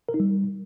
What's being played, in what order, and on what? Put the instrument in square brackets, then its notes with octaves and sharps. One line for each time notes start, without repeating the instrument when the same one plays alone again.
[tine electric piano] A#4
D#4
G3